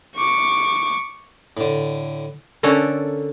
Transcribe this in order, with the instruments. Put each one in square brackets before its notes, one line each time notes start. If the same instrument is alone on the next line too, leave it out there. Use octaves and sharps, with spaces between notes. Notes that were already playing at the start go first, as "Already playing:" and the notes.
[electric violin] C#6 D6
[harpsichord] A2 D3
[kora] D3 C#4 A4 A#4